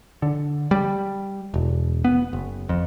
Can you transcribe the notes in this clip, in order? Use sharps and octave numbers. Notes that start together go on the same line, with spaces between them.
D3
G3
E1
B3
F#1
F2